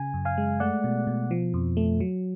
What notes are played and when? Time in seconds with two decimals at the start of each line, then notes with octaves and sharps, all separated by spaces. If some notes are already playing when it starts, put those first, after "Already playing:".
Already playing: C#3 G#5
0.14 F#2
0.25 F5 G#5
0.38 G#3
0.60 A3 D5 F#5
0.84 B2
1.07 B2
1.31 F3
1.54 F2
1.77 A3
2.00 F#3